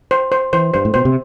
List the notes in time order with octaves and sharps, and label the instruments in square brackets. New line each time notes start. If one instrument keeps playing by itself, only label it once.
[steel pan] C5
C5
[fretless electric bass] E3 [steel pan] C5
[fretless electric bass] G2 [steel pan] C5
[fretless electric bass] A2
[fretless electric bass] B2 [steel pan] C5
[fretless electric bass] C3